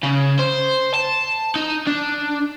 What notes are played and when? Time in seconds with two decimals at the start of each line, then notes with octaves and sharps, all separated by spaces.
0.04 C#3
0.39 C5
0.94 A5
1.56 D#4
1.87 D4